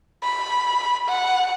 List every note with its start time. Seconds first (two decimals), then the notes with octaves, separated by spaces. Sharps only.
0.23 B5
1.08 F#5